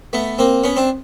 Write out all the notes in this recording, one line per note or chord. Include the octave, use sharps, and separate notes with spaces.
A3 B3
A#3 C4
B3 C#4
C4 D4